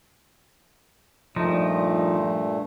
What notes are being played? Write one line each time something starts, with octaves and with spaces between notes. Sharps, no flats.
G2 A#2 F3 A3 D#4